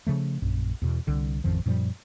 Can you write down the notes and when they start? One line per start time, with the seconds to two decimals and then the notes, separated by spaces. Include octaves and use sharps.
0.07 C#3 F3 A3
0.42 A#1 F#2
0.82 E2 B2
1.07 C2 D3 G3
1.44 A1 F2 D#3 F3
1.66 F#2 A#2 F3 G3